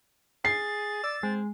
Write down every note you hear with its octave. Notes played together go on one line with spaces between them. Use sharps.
G#4 A6 C7
D5 E6
G#3 C4